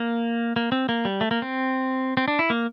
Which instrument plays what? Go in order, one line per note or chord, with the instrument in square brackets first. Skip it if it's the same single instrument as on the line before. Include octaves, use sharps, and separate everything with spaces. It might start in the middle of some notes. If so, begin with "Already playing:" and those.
Already playing: [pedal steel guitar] A#3
A#3
C4
A#3
G3
A3
A#3
C4
C4
D4
E4
A#3